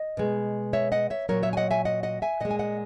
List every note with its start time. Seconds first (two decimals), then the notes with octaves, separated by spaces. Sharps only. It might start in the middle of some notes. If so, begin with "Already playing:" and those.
Already playing: D#5
0.17 B2 G#3
0.73 C#5 E5
0.92 D#5 F#5
1.10 C#5 E5
1.29 A#2 F#3 A#4 C#5
1.43 C#5 E5
1.53 G#5
1.57 D#5 F#5
1.71 E5 G#5
1.85 D#5 F#5
2.03 D#5 F#5
2.22 E5 G#5
2.40 A#2 G#3 D#5 F#5
2.51 G#5
2.59 D#5 F#5